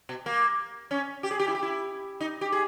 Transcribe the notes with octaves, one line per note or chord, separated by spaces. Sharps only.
B2
A#3
C#4
G4
G#4
G4
E4
G4
E4
D#4
G4
G#4